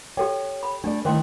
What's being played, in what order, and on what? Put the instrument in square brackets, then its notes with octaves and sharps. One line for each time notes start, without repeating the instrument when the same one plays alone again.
[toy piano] G4 A4 G5 [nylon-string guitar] C#5
[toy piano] B5
[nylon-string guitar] A3 D5 [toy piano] D4
[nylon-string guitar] D#3 E3 A3 [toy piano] C5 G5 C6